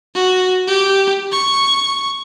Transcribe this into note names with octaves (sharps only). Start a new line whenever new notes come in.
F#4
G4
C#6